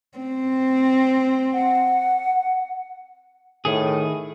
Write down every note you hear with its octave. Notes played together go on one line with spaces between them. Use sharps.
C4
F#5
A2 D#3 G#4